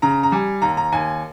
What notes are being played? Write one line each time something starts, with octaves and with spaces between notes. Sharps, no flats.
C#3 A#5
A#5
G3 G#5
D#2 A#5
A#5
D#2 G#5